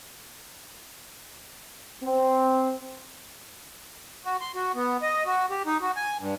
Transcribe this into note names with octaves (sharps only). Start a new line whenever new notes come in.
C4
F#4
C6
F#4
B3
D#5
F#4
G4
D#4
F#4
G#5
G2